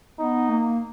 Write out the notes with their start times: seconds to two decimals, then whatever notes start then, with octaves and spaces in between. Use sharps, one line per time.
0.19 B3 D#4
0.49 A#3